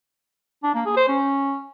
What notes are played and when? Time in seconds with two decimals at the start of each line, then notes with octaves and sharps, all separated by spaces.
0.63 D4
0.74 A#3
0.86 G#4
0.97 C5
1.08 C#4